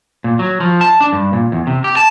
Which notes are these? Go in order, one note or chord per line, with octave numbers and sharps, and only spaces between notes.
A#2
F#3
F3
A5
D4
G2
A#2
E2
C3
G4
A5